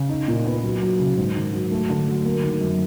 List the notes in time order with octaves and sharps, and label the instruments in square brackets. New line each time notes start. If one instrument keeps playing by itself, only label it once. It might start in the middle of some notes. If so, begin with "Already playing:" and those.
Already playing: [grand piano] C#3
D#4
A#2
B3
F#3
F#3
C#3
G#2
D#3
F#3
A3
D3
F#3
A#3
D#3
F#2